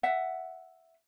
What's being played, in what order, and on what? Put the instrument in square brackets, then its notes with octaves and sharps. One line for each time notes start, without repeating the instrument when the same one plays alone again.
[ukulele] E5 F#5